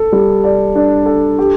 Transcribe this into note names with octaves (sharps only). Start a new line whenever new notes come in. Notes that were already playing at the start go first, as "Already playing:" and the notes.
Already playing: A4
G3
D5
D4
A4
G4